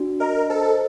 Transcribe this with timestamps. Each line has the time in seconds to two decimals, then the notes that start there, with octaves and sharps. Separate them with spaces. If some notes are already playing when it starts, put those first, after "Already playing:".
Already playing: D4 F#4
0.20 A#4 D#5
0.50 A4 C5